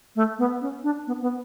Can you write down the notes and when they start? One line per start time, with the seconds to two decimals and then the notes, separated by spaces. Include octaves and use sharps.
0.16 A3
0.39 B3
0.61 C#4
0.83 D4
1.07 B3
1.22 B3